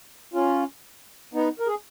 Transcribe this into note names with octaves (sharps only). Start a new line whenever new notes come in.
C#4 F4
B3 D#4
A#4
G#4